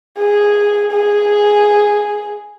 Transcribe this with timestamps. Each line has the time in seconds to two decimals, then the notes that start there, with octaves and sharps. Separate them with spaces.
0.18 G#4
0.92 G#4